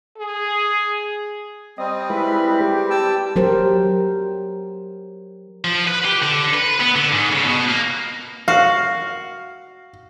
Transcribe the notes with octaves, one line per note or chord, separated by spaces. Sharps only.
G#4
G3 C4 D#5
G#3 E4 B4
G4
G5 A5 E6
F#3 G4 A#4 C5
F3
B4
G4
D3
B4
B3
D3
G#2
C#3
B2
A#3
F#4 F5